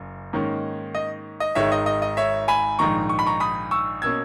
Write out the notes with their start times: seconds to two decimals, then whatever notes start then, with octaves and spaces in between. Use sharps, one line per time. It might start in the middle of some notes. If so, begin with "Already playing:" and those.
Already playing: F#1 F#2
0.33 G#2 D#3 A#3 C#4
0.95 D#5
1.40 D#5
1.55 G#1 G#2 D#3 G#3 C#5 E5
1.72 D#5
1.86 D#5
2.02 D#5
2.17 C#5 E5
2.48 G#5 B5
2.79 A#1 G#2 D#3 A#5 C#6
3.09 C#6
3.19 B5
3.26 A#5 C#6
3.40 B5 D#6
3.71 C#6 E6
4.02 B2 A#3 C#4 E6 G#6